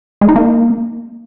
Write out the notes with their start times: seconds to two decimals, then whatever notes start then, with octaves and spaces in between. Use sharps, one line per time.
0.21 G#3
0.29 D#4
0.36 A#3